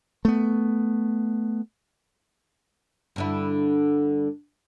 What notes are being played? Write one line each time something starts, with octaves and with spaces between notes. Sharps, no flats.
A3 B3
G2 D3 E4